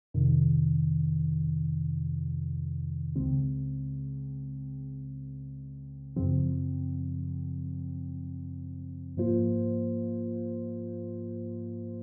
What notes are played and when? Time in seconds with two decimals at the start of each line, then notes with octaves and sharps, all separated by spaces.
0.14 F2 C3 D#3
3.15 C#2 C#3 G#3 C4
6.16 F#2 C#3 F3 C4
9.17 G#2 F3 A#3 F4 C5